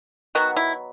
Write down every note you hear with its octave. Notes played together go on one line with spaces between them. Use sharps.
D#3 F#3 B3 F#4
E4